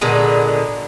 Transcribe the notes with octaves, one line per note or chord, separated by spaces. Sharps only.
A#2 D3 G#3 B3